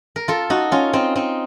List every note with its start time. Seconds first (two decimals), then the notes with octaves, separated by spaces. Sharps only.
0.16 A#4
0.28 F4 A4
0.50 D#4 F#4
0.72 C#4 F4
0.93 C4 D#4
1.16 C4 D#4